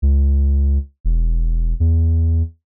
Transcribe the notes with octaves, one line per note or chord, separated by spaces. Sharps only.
C#2
E1
E2